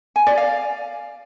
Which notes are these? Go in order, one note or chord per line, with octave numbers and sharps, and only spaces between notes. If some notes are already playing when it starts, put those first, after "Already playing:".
G#5
D5
F5